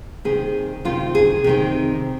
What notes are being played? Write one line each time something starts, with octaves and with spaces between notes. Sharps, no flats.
C3 D#3 C4 G#4
C3 D#3 C4 F4
G#4
C3 D#3 C4